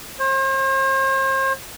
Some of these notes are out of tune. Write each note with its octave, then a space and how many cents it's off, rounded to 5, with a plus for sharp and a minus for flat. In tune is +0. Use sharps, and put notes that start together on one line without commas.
C5 +40